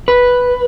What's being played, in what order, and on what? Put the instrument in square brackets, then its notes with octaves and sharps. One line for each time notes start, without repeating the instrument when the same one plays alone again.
[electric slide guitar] B4